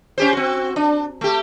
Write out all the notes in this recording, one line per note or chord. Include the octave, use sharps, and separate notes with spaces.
C#4 G4 C5
C4 F#4
D4
A3 G4